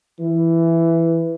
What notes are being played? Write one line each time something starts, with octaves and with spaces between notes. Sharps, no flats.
E3